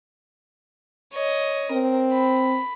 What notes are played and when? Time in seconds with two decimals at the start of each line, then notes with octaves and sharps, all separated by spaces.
1.13 C#5 D#5
1.71 C4 A#4
2.12 B5